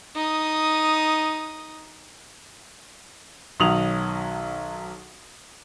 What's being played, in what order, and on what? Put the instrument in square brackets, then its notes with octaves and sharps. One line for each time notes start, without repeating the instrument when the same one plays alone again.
[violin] D#4 D#6
[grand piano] B1 D#3 F#3 D#6 F7 F#7